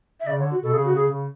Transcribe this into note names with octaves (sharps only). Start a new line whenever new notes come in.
E5
C#3 D5
D3 C#5
F#4
B2 A4
C#3 G#4
F#4
C#3 G#4
C#3